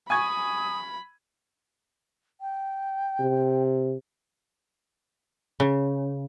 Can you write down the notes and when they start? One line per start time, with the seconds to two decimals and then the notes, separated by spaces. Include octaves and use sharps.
0.10 G#5 B5 C#6 D#6 G#6
2.41 G5
3.19 C3
5.60 C#3